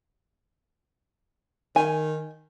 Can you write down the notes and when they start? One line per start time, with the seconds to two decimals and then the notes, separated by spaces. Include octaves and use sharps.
1.76 D#3 G#5